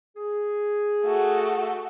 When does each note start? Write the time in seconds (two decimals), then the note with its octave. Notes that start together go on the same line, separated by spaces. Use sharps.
0.17 G#4
1.04 A3 F#4